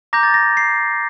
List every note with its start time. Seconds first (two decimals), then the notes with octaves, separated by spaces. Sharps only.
0.13 A#5 D6 G6 A#6
0.23 A6
0.34 A#6
0.57 C7